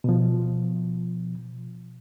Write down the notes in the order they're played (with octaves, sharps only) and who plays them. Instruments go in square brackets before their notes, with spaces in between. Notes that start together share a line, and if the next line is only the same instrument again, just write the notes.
[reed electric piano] B2 F3